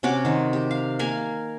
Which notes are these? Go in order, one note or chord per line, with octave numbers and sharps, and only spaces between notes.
C3 C#4 F#4 D6
D#3 C5
G4
F5
A#3 A#4 F5 G#5